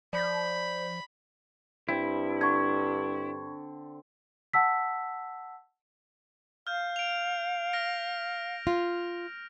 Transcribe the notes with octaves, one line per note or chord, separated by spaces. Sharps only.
F3 D5 B5 G6
G2 C4 E4
D3 C#6 G#6
F#5 A5 E6 B6
F5 F6 G6
D7 F7
F6 A#6 D7
F4